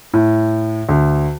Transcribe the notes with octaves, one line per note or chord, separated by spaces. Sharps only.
A2
D2